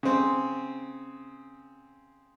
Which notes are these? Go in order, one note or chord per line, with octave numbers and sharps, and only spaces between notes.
C#3 C4